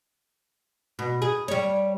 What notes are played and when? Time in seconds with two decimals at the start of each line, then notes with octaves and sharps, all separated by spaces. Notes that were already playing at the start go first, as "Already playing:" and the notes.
0.99 B2
1.22 G#4
1.48 G3 C#5